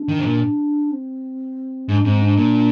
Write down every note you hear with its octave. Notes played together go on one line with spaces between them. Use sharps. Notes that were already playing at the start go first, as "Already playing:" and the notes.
Already playing: D4
D#3
C3
A#2
C4
G#2 D4
G#2 C4
D4
A#2